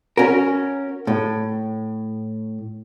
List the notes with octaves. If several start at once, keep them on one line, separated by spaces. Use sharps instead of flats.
C#4 F#4 A#4
A2